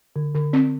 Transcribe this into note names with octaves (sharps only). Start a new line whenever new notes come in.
D3
D3
C4